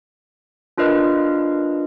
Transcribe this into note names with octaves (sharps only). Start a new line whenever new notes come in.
D4 F4 A#4 B4 D#5